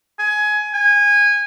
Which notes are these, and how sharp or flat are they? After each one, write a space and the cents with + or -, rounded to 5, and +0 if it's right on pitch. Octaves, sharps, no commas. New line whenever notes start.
G#5 +20
G#5 -20